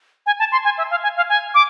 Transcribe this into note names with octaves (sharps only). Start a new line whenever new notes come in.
G#5
A5
C6
G#5
E5
F5
G#5
F5
G#5
D6